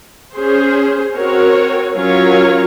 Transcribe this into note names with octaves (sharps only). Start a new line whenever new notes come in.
C#4 G#4 C5
C4 F#4 A#4 C#5
F#3 C#4 F4 A#4 C#5